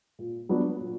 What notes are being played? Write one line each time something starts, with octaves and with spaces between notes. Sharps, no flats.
A#2
F#3 B3 D4 F#4
A#2